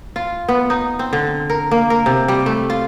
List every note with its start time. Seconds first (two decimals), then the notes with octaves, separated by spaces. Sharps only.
0.16 F4
0.49 B3
0.70 D#4
0.99 C4
1.13 D3
1.50 A#4
1.71 A#3
1.90 A#4
2.06 C3
2.28 G3
2.46 A3
2.70 F4